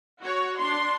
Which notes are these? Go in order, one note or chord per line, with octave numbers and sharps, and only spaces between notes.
F#4 C#5
D4 C6